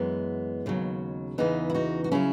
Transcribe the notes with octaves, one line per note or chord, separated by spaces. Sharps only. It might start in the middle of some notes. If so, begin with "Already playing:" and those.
Already playing: F#2 E3 G#3 B3
D#2 C#3 F#3
E2 C#3 E3 B3 D#4
E4
D#4 F#4
F#4
C#3 F#3 C#4 E4